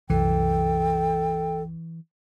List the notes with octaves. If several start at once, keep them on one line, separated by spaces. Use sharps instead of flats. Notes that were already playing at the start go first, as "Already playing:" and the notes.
C2 F#2 E3 A4 G5